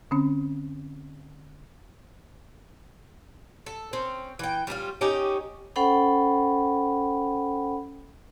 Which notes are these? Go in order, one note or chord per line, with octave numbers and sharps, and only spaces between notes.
D3 C4 C#4
A4
C4 C#4
E3 G5
G3 C#4 D#4 F4
C#4 D#4 G4
C#4 A4 C5 F#5 G5 B5